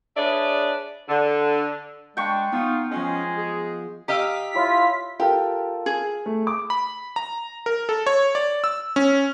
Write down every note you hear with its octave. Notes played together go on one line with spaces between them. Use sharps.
D4 G#4 B4 C#5 D5 E5
D3
G#3 D4 G5 C#6
B3 D#4 F4
F3 G#3 C#4 F4 D#5
G#4
G4 D#5 F5 A#5 E6 B6
E4 F4 C#5 B5
F4 G4 A4 A#4
G#4
A3
D6
B5
A#5
A#4
A4
C#5
D5
E6
C#4